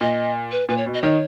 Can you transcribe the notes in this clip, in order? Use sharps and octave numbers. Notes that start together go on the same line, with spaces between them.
A#2 D#5
B4
A#2 B4
C#5
B2
D#5
D#3 C#5